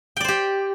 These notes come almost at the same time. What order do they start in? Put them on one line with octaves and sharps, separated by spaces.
G5 D5 C5 G4